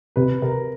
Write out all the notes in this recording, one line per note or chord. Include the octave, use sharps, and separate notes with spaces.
C3 B4
C3 A#4